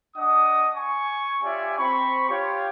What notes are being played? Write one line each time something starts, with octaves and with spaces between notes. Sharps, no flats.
D4 D#5 F#5 D#6
G#5 C#6
C#4 F4 G4 D5 E5 G#5
C4 B5 C#6
F4 G4 C#5